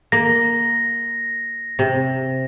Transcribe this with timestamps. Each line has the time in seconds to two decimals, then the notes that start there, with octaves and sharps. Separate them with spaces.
0.12 A#3 A#6
1.79 C3